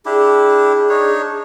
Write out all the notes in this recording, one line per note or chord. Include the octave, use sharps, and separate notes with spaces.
D4 E4 G4 G#4
D4 D#4 C#5